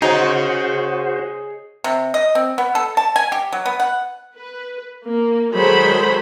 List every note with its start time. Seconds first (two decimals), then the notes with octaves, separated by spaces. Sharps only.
0.02 D#4 F#4 G#4 C5 C#5
1.84 C3
2.14 D#5
2.35 C4
2.58 B3
2.75 A4
2.97 A5
3.16 G#5
3.32 G4
3.53 F#3
3.66 B3
3.80 F#5
4.36 B4
5.05 A#3
5.55 D#3 F#3 G#3 A4 C5 B5